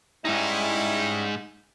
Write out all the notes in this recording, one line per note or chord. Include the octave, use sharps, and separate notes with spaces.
G#2 G3 C#4 D#4 E4